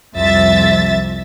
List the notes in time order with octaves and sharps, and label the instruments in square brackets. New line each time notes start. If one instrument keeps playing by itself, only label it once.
[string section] C2 F2 E5 A6